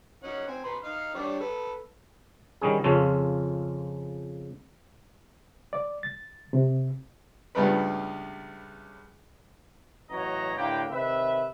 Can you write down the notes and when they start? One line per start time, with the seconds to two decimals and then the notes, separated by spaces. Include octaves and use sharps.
0.24 C#4 D#4 F#5
0.47 C4 G#5
0.64 B4 A#5 C6
0.84 D#4 F5
1.15 G3 D4 C#5
1.40 A4 B4
2.61 D#3 G3 C#4 G#4
2.84 F2 C#3 C#4 F4 A4
5.73 D5
6.03 A6
6.53 C3
7.55 C#2 G2 G3 A3 B3 B4
10.10 A1 F#3 F#4 C#5 D#5 A#5
10.56 A2 D3 A#3 G4 B4 G5
10.90 C3 D#3 B4 E5